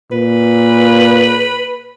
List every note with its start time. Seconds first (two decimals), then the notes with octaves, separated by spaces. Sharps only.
0.12 A#2 B4